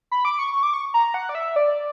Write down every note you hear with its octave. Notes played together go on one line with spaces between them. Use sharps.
B5
D6
C#6
C#6
D6
C#6
A#5
F#5
D5
E5
D5